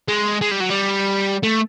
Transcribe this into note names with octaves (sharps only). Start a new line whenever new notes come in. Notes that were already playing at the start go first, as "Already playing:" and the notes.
G#3
G#3
G3
F#3
G3
A3